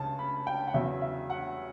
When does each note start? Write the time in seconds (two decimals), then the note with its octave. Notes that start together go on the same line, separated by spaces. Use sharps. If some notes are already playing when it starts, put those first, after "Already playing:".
Already playing: C#2 C#3 A5
0.19 B5
0.47 G5
0.67 F#5
0.74 E2 C#3 F#3 E5
1.02 E5
1.30 F#5